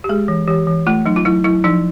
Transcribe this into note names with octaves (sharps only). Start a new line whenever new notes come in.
G4
G#3 G#4
E3
E3 G4
E3
A3 F4
F#3 D#4
F4
F#3 E4
F#3 E4
F3 D#4